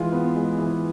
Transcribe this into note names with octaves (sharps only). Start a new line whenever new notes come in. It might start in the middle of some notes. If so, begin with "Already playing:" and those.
Already playing: E3 G#3 F4
B3
G#3
E3